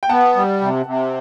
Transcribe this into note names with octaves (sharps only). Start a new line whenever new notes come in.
G5
B3 F#5 A5
G3
C3
C3